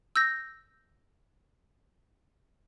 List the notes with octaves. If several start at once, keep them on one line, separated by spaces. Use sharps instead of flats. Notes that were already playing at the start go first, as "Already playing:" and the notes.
E6 G6 A#6